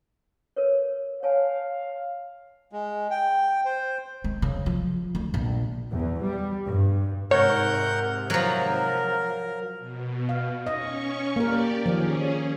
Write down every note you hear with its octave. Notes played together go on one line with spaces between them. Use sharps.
A#4 B4 C#5
C#5 F5 G#5 A5
G#3
G5
C5
G#3
C#3
F3
D2
A#1
E2
G3
G2
G#2 C3 A#4 C#5 F#5 G6
F3 F#3 A#4
B2
F5
C#4 D#5 C#6
A#3 G4 A#4 D5
D#3 F3 C#4 G#4